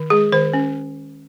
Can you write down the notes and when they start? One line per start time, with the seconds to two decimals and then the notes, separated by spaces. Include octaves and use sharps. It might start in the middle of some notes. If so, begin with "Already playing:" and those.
Already playing: D#3
0.10 G#3 G#4
0.32 D#3 C5
0.53 C#4